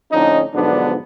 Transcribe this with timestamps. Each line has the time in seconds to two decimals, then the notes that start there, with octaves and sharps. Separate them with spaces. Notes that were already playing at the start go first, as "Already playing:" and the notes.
0.11 F2 A2 D3 C#4 D#4
0.53 B1 G#2 D3 F3 B3 D4